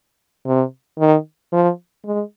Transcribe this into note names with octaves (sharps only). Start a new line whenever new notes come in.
C3
D#3
F3
G#3